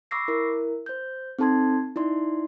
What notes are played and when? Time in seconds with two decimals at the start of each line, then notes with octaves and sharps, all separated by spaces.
0.11 B5 C#6 D6 E6 A#6 C7
0.28 E4 A#4
0.86 C5 G6
1.39 C4 D#4 A4 A5 C6 G#6
1.96 D#4 E4 D5 C6